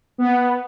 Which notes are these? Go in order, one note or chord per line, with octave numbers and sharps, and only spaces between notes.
B3